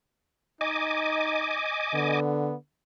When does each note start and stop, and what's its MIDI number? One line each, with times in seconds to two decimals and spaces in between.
0.61 1.64 63
0.61 2.20 75
0.61 2.20 80
0.61 2.20 86
1.94 2.55 50
1.94 2.55 59